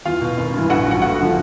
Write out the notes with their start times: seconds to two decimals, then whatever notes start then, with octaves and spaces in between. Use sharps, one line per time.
0.05 E2 F4 F5
0.21 B2
0.37 G#1
0.54 G2 E3
0.70 A#1 F#4 F#5
0.86 G#2 F3 F#4 F#5
1.02 G1 F#4 F#5
1.20 D3 F3